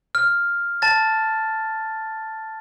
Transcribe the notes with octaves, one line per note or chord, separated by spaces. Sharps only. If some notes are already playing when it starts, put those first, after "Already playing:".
F6
A5 A6